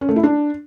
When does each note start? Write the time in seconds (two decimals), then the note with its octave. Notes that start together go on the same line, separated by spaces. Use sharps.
0.01 C#4
0.09 A3
0.16 E4
0.23 D4